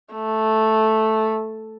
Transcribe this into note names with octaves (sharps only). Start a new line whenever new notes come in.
A3